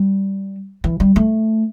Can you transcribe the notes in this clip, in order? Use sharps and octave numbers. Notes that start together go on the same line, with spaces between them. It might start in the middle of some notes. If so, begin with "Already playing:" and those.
Already playing: G3
E3
G3
A3